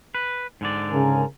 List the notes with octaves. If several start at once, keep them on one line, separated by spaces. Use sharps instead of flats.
B4
G#2 D3 D5
C#3 A#4 G#5